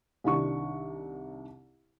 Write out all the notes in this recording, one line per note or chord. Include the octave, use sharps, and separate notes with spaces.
C2 D#3 D4 C#6